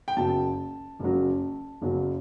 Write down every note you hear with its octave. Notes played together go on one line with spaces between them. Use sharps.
G5
F#1 F#2 C#3 F#3 A5
F#1 F#2 C#3 F#3
F#1 F#2 C#3 F#3